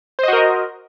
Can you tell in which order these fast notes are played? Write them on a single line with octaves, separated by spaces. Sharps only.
C5 D#5 F#4 A#4